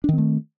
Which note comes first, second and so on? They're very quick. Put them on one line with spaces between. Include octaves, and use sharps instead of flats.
D4 D#3 C4 A3